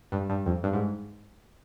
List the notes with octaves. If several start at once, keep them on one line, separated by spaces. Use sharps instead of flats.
G2
G2
F2
G2
G#2